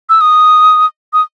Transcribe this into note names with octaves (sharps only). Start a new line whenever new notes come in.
E6
D#6
D#6